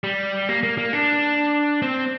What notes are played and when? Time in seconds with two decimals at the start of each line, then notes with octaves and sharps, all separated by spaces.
0.04 G3
0.49 A#3
0.63 A#3
0.78 A#3
0.93 D4
1.82 C4